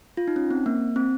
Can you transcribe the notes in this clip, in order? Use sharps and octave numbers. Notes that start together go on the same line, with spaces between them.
F4
D#4
C#4
C4
A#3
C4